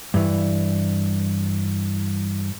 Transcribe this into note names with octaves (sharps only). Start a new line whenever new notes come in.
G2 E3